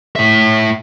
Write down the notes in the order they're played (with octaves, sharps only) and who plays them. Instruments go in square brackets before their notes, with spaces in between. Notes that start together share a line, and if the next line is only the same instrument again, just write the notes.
[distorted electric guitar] A2 E5